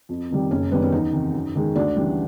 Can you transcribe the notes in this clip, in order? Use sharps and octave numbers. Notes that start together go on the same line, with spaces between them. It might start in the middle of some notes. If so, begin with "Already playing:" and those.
F2
C3 D#3 G3
F#1 C#4
F#2 D#3 G3 B3
C#4
E2 D#4
C3 D#3
F#2
D#3 G#3
D2 D4
C#3 E3 G3